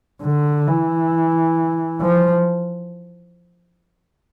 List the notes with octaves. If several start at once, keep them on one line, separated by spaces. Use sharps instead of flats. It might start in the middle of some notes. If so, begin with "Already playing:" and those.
D3
E3
F3